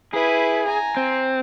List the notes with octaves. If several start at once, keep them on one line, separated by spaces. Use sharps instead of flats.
E4 G#4 B4
G#5 A#5
C4